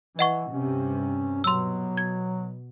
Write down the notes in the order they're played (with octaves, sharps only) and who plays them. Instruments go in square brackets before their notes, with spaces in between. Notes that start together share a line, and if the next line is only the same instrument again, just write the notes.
[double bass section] E3 [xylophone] D#5 F#5 C#6
[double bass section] G2 C3 [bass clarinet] C#4
[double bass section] B2 [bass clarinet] F#3 [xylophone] C6 E6
[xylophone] G#6